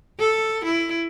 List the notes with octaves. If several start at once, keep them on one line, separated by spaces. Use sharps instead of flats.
A4
E4